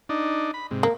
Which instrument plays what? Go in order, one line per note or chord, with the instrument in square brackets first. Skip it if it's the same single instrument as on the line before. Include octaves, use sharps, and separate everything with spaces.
[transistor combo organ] D4 D#4
B5
G#2 C3
[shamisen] A#3